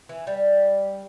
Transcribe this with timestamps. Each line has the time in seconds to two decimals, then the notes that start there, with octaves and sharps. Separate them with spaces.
0.09 E3
0.27 G3